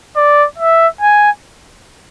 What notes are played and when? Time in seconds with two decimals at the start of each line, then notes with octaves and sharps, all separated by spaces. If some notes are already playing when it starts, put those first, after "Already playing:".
0.17 D5
0.58 E5
1.01 G#5